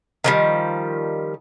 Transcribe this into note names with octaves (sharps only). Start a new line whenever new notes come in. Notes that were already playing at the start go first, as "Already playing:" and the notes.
D#3 F3 G3